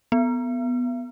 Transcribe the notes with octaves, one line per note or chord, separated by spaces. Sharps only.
B3